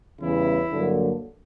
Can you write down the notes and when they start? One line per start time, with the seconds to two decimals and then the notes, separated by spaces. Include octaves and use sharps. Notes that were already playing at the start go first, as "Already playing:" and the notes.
0.20 E2 C#3 E3 G3 E4
0.71 G2 D3 F#3 A#3